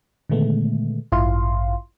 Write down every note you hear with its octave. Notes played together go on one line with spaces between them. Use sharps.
A#2 D3 D#3 G#3 A3 B3
A1 G2 E4 F4 F5 C6